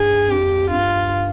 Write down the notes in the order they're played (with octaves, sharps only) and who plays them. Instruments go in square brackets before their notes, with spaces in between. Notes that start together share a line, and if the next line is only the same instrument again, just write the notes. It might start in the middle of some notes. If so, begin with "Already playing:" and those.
Already playing: [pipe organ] G2 [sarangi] G#4
[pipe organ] F2 [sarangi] G4
[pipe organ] G2 [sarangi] F4